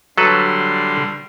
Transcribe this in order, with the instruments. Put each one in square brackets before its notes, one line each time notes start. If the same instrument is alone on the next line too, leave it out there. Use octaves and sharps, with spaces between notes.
[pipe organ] D3 G3 C6 [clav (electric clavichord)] F#3 A4 B4